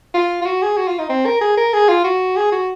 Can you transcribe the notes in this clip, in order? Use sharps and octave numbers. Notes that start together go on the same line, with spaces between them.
F4
F4
F#4
G#4
F#4
F4
D#4
C4
A#4
G#4
A#4
G#4
F4
F#4
G#4
F#4